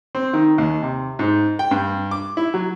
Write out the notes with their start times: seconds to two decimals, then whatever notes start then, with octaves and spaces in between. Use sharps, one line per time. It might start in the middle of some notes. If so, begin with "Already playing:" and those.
0.15 C4
0.33 D#3
0.58 D#2
0.82 C3
1.19 G#2
1.59 G5
1.71 G2
2.11 D6
2.37 E4
2.54 F#3